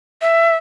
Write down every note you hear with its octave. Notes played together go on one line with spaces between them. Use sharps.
E5